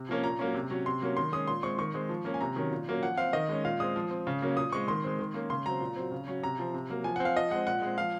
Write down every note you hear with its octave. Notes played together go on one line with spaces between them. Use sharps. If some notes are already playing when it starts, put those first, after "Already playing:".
Already playing: C3
F3 A#3 C#4
A#2 A#5
F#3 A#3 C#4
C3
F#3 C#4
C3 C6
F#3 A#3 C#4
D#3 C6
G#3 C#4 D#6
A#2 C6
G#3 C4 C#6
D#3 C#6
G#3 C4
F3
A#3 C#4
G#5
C3 A#5
D#3 F#3 C#4
A#2
F#3 A#3 C#4
F3 F#5
C4 F5
D#3 D#5
G#3 C#4
A#2 F5
G#3 C4 D#6
F3
C4
C#3
F#3 A#3 C#4
A#2 D#6
G#3 C4 C#6
D#3 C6
G#3 C4
D#3
A#3 C#4
C#3 C6
F#3 C4 A#5
A#2
F#3 C4
C#3
F#3 C#4
C3 A#5
F3 C4
C3
F#3 A#3
F3 G#5
C4 F#5
F5
F3 D#5
G#3 C4 F#5
A#2 F#5
G#3 C4
F3 F5